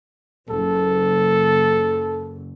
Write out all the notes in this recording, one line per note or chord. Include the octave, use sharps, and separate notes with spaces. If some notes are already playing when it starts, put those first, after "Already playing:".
F#1 A4